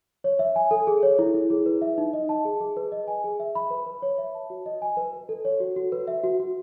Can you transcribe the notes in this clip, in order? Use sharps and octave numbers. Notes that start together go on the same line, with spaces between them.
C#5
E5
G#5
A4
G#4
C#5
E4
E4
G#4
B4
E5
D#4
D#5
A5
G#4
G#4
B4
D#5
G#5
G#4
E5
B5
B4
B4
C#5
E5
A5
F#4
D#5
G#5
B4
B4
A4
C#5
F#4
F#4
B4
E5
F#4
F#4